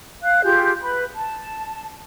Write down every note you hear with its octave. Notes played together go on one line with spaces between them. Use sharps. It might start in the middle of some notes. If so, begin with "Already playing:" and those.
F5 F#6
F4 G4 G#4 G6
B4 B5
A5